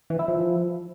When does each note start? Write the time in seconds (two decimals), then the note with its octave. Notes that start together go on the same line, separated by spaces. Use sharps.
0.10 E3
0.19 E4
0.28 F3